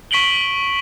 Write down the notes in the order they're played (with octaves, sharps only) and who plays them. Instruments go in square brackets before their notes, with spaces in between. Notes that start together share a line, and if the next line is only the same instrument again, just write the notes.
[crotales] C#6 B6 D7 F#7 G7